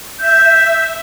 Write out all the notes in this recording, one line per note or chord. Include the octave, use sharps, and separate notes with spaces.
E5 G6